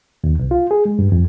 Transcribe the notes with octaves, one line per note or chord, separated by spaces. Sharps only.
D#2
C2
F4
G#4
G#3
G2
F2